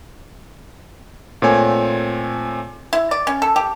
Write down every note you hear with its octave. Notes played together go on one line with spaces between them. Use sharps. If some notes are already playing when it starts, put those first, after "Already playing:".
A#2 A3 C4 A4 C#5 G#5
E4
D5
C#4
A4
G4